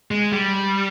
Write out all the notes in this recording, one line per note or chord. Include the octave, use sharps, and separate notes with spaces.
G#3
G3